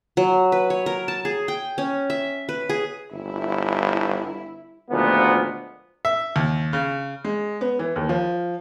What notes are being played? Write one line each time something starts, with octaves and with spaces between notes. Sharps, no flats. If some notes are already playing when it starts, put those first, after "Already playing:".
F#3
B4
C#5
A#4
A5
G#4
G5
C#4
E5
B4
G#4
G1 E4
D2 A#2 D#3 F3 G#3 B3
E5
D#2
C#3
G#3
B3
E3
D#2
F3